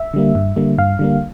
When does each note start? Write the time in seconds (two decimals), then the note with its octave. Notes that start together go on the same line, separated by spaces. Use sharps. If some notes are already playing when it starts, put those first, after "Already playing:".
Already playing: E5
0.13 D3 G3 A#3
0.35 G2
0.56 D3 G3 A#3
0.78 G2 F5
0.99 D3 G3 A#3